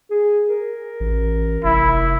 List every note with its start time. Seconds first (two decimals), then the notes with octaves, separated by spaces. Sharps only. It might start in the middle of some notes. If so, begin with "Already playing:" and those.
0.10 G#4
0.48 A#4
1.00 A1
1.64 F1 E4